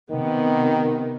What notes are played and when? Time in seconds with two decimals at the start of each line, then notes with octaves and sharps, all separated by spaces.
0.10 C3 D#3 B3